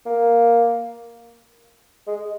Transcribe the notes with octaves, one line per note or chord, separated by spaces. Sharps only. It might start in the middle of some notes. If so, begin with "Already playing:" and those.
A#3
G#3